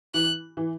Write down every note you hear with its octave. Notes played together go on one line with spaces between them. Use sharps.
E3 F#6
E3